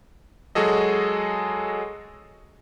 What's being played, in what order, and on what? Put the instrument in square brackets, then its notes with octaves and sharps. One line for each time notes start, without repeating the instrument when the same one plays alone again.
[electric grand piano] F#3 G#3 F#4 G#4 A4 D#5